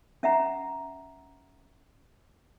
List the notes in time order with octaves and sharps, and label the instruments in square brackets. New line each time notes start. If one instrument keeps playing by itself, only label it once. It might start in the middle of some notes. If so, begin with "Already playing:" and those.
[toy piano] C#4 E5 F#5 A#5